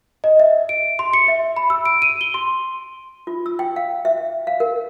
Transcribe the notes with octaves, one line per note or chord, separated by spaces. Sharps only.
D#5
E5
D7
C6
C#7
E5
B5
E6
D7
D#7
G7
C6
F4
E6
G5
F5
E5
F5
A#4